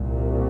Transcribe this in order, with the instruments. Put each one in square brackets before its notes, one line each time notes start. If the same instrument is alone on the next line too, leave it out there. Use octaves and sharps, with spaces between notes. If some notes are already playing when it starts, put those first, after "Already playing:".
Already playing: [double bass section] C2 A#2